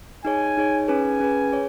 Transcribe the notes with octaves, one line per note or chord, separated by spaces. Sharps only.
D#4 G#4 C#5 G#5
D#4 G#4 C#5
C#4 G#4 B4 G#5
C#4 G#4 B4
G#4 C#5